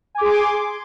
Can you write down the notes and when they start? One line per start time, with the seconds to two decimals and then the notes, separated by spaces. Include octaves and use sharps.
0.15 G#5
0.18 D6
0.21 G#4
0.24 C6